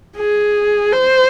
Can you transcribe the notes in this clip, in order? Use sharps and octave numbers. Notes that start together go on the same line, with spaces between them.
G#4
C5